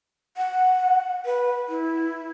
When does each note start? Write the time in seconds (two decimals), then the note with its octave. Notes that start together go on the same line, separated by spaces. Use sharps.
0.37 F#5
1.26 B4
1.69 E4